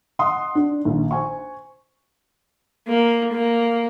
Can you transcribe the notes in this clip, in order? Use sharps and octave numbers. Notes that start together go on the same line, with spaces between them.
D#5 F#5 C6 D#6
D4
A#1 D#3
C5 G#5 C#6
A#3
A#3